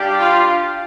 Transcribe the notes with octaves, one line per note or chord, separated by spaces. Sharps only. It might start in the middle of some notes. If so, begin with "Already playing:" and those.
Already playing: G3 D4 G4 D5 F5
F4